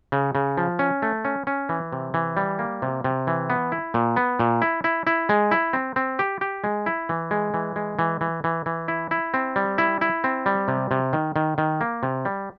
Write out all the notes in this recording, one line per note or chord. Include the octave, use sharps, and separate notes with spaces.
C#3
C#3
F3
C#4
A3
C#4
C#4
E3
C3
E3
G3
A#3
C3
C3
E3
B3
E4
A#2
B3
A#2
E4
E4
E4
G#3
E4
C4
C4
G4
G4
G#3
E4
E3
G#3
E3
G#3
E3
E3
E3
E3
E4
E4
C4
G3
E4
E4
C4
G3
C3
C3
D#3
D#3
D#3
A#3
C3
G3